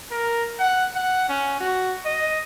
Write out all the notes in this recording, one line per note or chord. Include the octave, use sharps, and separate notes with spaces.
A#4
F#5
F#5
C#4
F#4
D#5